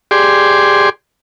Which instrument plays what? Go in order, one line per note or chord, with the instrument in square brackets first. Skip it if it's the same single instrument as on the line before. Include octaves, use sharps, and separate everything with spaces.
[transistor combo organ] G4 G#4 D5 C6